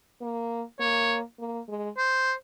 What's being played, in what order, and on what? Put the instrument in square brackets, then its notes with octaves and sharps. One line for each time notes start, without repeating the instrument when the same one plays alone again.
[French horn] A#3
[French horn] A#3 [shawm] C#5
[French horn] A#3
G#3
[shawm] C5